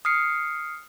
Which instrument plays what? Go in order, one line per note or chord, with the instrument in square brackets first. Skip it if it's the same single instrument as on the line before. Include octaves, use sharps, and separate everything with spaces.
[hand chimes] D#6 F6 C7 C#7